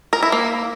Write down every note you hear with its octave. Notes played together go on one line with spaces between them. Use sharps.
A#4
E4
A#3